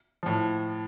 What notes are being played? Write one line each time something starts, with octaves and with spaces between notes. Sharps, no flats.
A2 F3